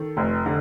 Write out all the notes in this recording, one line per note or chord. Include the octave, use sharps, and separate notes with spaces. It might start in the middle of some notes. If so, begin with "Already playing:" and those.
Already playing: D#3 A4
F1
D3